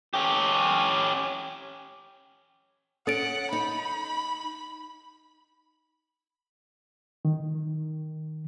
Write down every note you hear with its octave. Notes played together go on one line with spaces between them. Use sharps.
C#4 G4
C#4 A4 F#5 A6 D7
D#4 B5
D#3